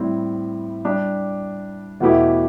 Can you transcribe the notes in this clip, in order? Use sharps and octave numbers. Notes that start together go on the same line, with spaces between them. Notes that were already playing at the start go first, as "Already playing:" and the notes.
Already playing: A2 G3 C4 E4
G3 D4 G4
E2 B2 A3 E4 G4